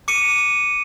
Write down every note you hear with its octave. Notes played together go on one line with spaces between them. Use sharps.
D6 C#7 D#7